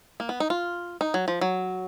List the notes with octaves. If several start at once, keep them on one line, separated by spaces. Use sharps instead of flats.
A#3
B3
D#4
F4
D#4
F#3
F3
F#3